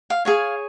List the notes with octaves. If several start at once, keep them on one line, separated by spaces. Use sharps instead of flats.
F5
G#4 C#5 F5